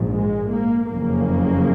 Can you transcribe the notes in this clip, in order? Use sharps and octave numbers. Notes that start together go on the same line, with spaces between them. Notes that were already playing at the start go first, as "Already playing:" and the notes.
Already playing: A#1 G#2
G#3
A#3
F#1 F2 C#3 A#3